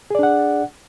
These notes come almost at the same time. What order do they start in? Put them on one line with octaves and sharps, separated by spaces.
G#4 D5 D4 F#5